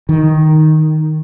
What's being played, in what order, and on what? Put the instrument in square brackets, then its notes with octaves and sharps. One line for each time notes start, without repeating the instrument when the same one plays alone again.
[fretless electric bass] D#3